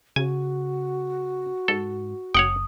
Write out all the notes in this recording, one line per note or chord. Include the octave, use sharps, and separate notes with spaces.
C#3 F#4 G#5
G#2 A4
F#1 C#5 F#5 G5 D#6